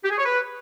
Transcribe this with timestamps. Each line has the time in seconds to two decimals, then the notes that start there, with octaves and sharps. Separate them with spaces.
0.03 G4
0.10 G#4
0.18 C#5
0.25 B4